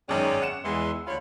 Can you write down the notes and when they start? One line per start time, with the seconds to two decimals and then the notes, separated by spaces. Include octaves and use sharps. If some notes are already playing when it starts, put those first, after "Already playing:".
0.09 G#1 F#2 D#3 C#4 G#4 D5 G5
0.42 F#5 C#7 E7
0.64 E2 E3 G#3 E5 C6
1.07 D2 D3 F4 C#5 B5